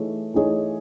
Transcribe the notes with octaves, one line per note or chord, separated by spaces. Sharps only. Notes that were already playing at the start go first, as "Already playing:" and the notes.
Already playing: E3 A3 D#4 G#4 C#5
E3 A3 D#4 G#4 C#5